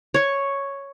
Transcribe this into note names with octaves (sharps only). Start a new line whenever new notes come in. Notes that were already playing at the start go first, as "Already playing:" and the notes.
C#5 C#6